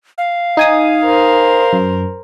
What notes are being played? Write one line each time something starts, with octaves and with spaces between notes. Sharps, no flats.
F5
D#4 G#5 D#6
A#4 C5
F#2